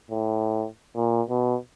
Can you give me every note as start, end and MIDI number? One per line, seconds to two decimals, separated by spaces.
0.11 0.65 45
0.96 1.22 46
1.30 1.56 47